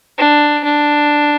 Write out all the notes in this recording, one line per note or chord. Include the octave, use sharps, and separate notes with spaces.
D4
D4